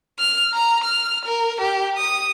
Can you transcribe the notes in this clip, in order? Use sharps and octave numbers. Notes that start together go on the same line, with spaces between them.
F6
A#5
F6
A#4
G4
D#6